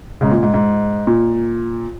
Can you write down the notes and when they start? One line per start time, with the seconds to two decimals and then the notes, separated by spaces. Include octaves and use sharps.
0.21 G#2 C#3
0.32 A#2
0.43 G#2
0.54 G#2
1.07 A#2